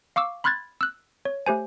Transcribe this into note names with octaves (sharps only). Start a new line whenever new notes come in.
F5 C#6 D6 E6
B5 C6 F6 F#6 G#6 A6
E6 F#6
C#5
A3 G4 C5 G#5